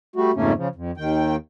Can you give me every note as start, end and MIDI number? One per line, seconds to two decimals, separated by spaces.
0.16 0.31 55
0.16 0.31 57
0.16 0.31 66
0.35 0.53 41
0.35 0.53 44
0.35 0.53 49
0.35 0.53 57
0.35 0.53 58
0.35 0.53 61
0.56 0.68 49
0.56 0.68 53
0.76 0.91 41
0.97 1.36 39
0.97 1.36 51
0.97 1.36 79